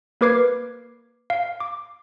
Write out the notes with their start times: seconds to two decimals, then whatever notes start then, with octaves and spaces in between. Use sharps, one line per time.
0.21 A#3 A#4 B4 D6 G#6 C7
1.30 F5
1.60 D6